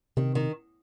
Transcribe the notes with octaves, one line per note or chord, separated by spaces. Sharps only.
C3 D#3
D#3